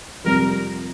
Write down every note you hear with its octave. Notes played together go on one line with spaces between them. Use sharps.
F2 C3 G3 A#4